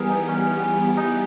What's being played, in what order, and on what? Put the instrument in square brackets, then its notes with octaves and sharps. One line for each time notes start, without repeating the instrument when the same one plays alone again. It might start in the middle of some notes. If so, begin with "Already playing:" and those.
Already playing: [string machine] E3 G3 B3 G4 [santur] G#4 A#4
[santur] D#4
C#4
D#4